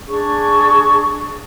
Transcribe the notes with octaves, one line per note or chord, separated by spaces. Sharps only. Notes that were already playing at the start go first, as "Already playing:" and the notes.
D4 G#4 C#6